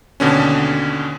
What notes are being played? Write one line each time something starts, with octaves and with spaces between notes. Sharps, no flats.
D#2 B2 D3 C#4